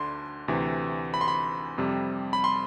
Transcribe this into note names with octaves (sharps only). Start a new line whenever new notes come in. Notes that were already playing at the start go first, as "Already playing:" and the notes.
Already playing: D2 D3 D4 C6
D2 C3 E3
B5
C6
B5
F2 C3 G3
B5
C6